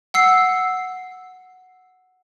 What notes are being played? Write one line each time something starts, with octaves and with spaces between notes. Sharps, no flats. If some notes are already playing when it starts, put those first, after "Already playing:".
F#5 E6 C7